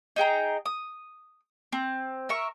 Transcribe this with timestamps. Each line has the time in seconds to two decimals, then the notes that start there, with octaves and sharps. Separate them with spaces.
0.16 D#4 G#4 G5 A#5
0.66 D#6
1.72 C4
2.29 A#4 E5 C#6